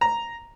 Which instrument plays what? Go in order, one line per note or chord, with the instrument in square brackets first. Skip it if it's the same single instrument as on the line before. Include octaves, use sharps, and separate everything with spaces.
[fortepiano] A#5